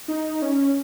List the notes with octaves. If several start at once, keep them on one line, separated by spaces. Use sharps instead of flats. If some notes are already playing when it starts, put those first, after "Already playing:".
D#4
C#4